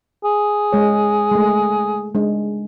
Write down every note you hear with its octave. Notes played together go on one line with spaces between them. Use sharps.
G#4
G#3 C#5
G#3 A3
G#3 D4